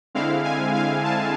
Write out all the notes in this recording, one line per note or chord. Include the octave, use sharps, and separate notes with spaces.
D3 G#3 C4 E4 F5
G#5
F5
A5